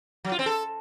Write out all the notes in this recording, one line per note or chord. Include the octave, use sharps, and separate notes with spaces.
F#3
F4
C4
A4